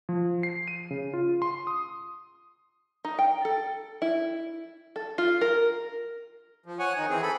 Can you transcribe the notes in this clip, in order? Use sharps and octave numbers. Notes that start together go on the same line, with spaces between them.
F3
C7
D#7
C#3
F4
C6
D#6
D#4
G5
A4
E4
A4
F4
A#4
F3
C#5 F#5 G#5
D#3 D#4
E3 C4 G#4
A4 B5